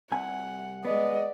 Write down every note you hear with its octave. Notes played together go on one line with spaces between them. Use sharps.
C2 C3 F#5 G#5
G#3 B3 D5 D#5